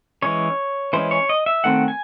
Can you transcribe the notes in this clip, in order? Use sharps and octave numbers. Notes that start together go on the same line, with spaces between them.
E3 G#3 C#4 C#5
E3 G#3 C#4 C5
C#5
D#5
E5
D#3 A3 C4 F#5
G#5